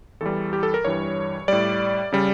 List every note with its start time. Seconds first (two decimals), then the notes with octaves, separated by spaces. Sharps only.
0.21 E2 E3 G3 A4
0.53 G4
0.63 A4
0.74 A#4
0.85 G2 E3 G3 C#5
1.48 A2 G3 D5
2.12 C#3 G3